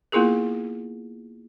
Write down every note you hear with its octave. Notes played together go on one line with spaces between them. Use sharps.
A#3 B3 E4 F4 G#4 A#4